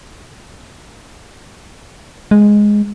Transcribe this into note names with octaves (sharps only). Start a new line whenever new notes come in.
G#3